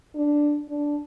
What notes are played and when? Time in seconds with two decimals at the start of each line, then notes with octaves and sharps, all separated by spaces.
0.15 D4
0.69 D4